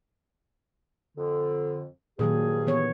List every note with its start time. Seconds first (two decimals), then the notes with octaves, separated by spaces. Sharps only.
1.17 F2 D3
2.19 G2 A#2 D#3 F#3 G#4
2.67 E3 B3 C#5